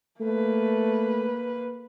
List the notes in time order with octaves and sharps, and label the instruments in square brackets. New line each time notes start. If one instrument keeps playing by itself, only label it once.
[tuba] A3 [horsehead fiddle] A#3 B4